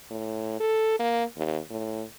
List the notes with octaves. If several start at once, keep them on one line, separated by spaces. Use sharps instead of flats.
A2
A4
A#3
D#2
A2